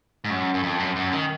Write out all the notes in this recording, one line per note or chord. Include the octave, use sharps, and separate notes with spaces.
G#2
F#2
F#2
F2
F#2
F#2
D#3